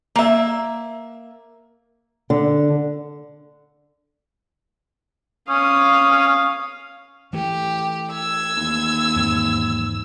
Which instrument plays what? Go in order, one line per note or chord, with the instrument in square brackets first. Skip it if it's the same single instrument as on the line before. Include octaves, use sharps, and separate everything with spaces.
[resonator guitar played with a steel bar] A#3 E5
[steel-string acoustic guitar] D3
[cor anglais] C#4 [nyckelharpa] F5 D#6
[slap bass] E3 A3 [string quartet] G4
[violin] E6 [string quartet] G#6
[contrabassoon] D#2
[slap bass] E2 G#2 C4